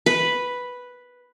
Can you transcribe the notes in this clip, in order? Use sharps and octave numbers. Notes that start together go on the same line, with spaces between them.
B4